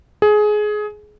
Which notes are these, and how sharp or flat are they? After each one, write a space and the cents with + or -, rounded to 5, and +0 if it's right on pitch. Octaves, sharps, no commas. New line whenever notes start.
G#4 +20